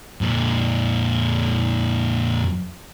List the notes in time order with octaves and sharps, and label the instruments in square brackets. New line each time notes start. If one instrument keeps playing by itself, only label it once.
[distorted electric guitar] F2 A#2